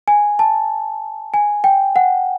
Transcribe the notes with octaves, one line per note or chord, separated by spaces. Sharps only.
G#5
A5
G#5
G5
F#5